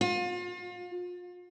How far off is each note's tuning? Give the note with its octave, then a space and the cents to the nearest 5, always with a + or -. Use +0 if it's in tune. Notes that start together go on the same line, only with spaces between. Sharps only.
F4 +35